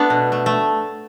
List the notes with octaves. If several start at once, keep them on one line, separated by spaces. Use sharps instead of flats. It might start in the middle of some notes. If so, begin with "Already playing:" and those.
Already playing: A3 B3 D4
B2
A3
A3